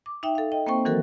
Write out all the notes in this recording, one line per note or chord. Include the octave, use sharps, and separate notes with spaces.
D6
D#4 E5 G5
A4 F5
D#5 G5
A#3 C4 C5 G5 C#6
D#3 E3 F#3 F#4 A4 A#4